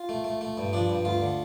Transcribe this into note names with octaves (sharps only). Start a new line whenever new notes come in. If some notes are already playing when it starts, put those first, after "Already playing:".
Already playing: F4
A3
A3
A3
G2
F3 D4
G2
D2 F4
D3